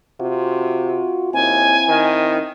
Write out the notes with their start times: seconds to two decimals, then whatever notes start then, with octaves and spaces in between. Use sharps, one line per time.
0.20 C3 F4 F#4
1.33 D#2 C4 E4 G#5
1.88 D#3